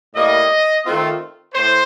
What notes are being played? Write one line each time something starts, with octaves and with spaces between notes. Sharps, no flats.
A2 G3 A#3 D#5
D#3 A3 C4 F4
A2 C5